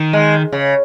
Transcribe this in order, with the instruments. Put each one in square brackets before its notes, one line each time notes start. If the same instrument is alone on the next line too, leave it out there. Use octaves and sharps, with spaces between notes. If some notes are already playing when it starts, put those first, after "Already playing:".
Already playing: [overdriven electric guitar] D#3
[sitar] G#3
C#3